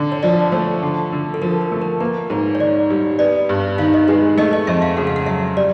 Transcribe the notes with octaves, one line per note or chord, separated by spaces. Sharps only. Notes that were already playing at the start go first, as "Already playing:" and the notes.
Already playing: D3 D4
C#5
F3 D5
A3 C5
D3
D3
A4
F3 A#4
A#4
A3
A#4
A#3 B4
G#2 C#5
C#5
D#3 D5
G3
B3 D5
G2
D#3 F5
D#5
G#3 B4
A3 D#5
D#5
F2 E5
F5
C#3 F#5
F5
F#5
F#3 E5
G3 D5